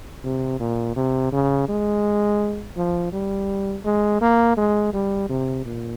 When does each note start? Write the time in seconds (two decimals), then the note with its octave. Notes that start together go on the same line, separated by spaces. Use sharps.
0.24 C3
0.60 A#2
0.96 C3
1.32 C#3
1.69 G#3
2.77 F3
3.12 G3
3.85 G#3
4.21 A#3
4.57 G#3
4.93 G3
5.29 C3
5.65 A#2